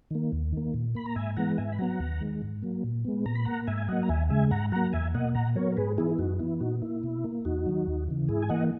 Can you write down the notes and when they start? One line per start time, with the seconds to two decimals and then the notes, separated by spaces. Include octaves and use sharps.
0.11 D#3 A#3
0.32 D#2
0.53 D#3 A#3
0.74 A#2
0.95 A#3 B5
1.06 A#5
1.16 G#2 E5 G#5
1.37 E3 G#3 B3 F#5 A#5
1.58 G#2 E5 G#5
1.72 B5
1.78 F#3 B3 F#5 A#5
2.00 D#2
2.20 D#3 G#3
2.42 G#2
2.62 F#3 A#3
2.84 A#2
3.04 G#3 B3
3.26 A#2 A#5
3.35 B5
3.45 A#3 F#5 A#5
3.67 G#2 E5 G#5
3.78 G#5
3.88 F#3 A#3 D#5 F#5
4.03 A#5
4.09 D#2 E5 G#5
4.30 C#3 G#3 E5 G#5
4.51 G#2 F#5 A#5
4.72 F#3 A#3 F#5 A#5
4.93 E2 E5 G#5
5.14 B2 A#3 D#5 F#5
5.35 A#2 F#5 A#5
5.56 F#3 B3 A#4 C#5
5.72 A#4
5.77 G#2 G#4 B4
5.98 E3 B3 E4 G#4
6.11 E4
6.18 F#2 D#4 F#4
6.39 E3 B3 E4
6.60 A#2 D#4 F#4
6.82 A#3 E4
7.03 B2
7.24 A#3
7.45 E2 D#4 F#4
7.66 D#3 F#3
7.87 D#2
8.08 C#3 E3
8.28 G#2 E4 G#4
8.42 G#5
8.49 E3 A#3 D#5 F#5